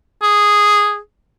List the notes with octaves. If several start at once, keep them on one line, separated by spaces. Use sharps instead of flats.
G#4